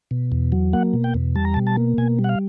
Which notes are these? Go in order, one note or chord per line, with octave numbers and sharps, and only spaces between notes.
B2
E2
F#3
A#3 F#5
B2
G5
E2
G3 A5
A#5
B2 A5
A5
A#3
B2 G#5
G3
F#5
F5